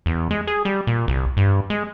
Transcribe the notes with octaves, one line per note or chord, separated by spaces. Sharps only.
E2
G#3
G#4
G3
A#2
C2
G2
G#3